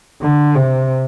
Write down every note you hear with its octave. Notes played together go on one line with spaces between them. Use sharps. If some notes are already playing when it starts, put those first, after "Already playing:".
D3
C3